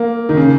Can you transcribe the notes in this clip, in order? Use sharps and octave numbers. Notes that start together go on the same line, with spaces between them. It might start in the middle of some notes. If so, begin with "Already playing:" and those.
Already playing: A#3
D#3
C#3